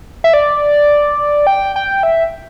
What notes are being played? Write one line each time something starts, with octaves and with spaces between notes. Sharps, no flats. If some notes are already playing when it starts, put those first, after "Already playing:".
E5
D5
G5
G5
E5